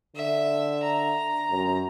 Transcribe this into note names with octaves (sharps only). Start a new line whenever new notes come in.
D3 E5
A#5
F#2